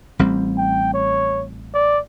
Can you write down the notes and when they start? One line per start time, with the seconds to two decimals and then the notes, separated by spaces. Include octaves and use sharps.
0.19 A1 G3 C4
0.58 G5
0.94 C#5
1.74 D5